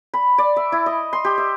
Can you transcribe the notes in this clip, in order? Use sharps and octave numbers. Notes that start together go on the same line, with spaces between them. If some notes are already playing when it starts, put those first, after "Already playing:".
B5
D5
E5
E4
D#5
C6
G4
E5